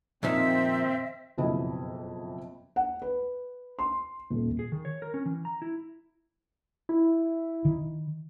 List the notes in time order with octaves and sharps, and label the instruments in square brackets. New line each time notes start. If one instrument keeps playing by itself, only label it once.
[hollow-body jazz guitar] F2 A#2 D#3 [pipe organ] C4 [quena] E5
[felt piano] F#1 F2 B2 E4 D#5 B5
F#5
B4
C6
D#1
[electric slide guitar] G#4
D#3
C#5
A#4
C#4
E3
A#5
E4
[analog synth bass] E4
[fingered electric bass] D#3